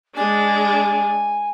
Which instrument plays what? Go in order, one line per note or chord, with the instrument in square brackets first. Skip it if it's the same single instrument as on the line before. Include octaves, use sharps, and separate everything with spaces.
[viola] G#3 D4 [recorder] G#5